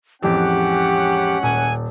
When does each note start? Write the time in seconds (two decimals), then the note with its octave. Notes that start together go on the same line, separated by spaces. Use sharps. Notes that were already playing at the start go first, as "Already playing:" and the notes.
0.23 A1 F2 G#3 C#4 G4 F#5
1.43 D#1 G#5